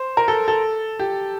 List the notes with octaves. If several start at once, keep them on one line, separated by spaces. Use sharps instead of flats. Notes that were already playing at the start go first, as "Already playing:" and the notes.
Already playing: C5
A#4
A4
A4
G4